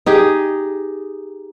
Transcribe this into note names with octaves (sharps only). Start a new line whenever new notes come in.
D#4 G4 G#4